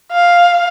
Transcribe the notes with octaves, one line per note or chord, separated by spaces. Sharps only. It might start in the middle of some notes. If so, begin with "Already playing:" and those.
F5